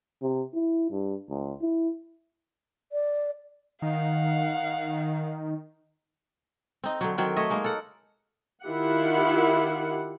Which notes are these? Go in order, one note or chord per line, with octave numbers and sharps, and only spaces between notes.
C3
E4
G2
C#2
E4
D5
D#3 F5 F#5
C4 D#4
D3 F#3
D#3 F#3 C4
A3 C#5 D#5 E5
G#3 A#3 D#4
A4 A#4 F#5
D#3 E4 F4 G4 F#5